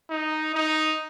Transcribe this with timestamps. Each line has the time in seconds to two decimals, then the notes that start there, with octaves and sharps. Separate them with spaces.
0.10 D#4
0.54 D#4